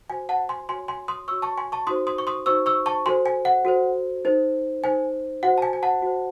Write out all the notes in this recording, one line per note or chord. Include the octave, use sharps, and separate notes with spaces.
F#4 C5 G#5
F#5 A5
G#5 C6
F#4 C#5 G#5 C6
G#5 C6
C6 D#6
F#4 C#5 C#6 E6
A5 C#6
G#5 C6
A5 C#6
D#4 F#4 C5 C6 D#6
C6 D#6
C#6
C6 D#6
D#4 F#4 C5 C#6 E6
C#6 E6
A5 C#6
F#4 A4 C5 G#5 C6
G#5
F#5
F#4 A4 C5
D#4 A4 C5
D#4 A4 C5 G#5
F#4 C5 F#5
A5
G#5
G#5
F#5 A5
F#4 C5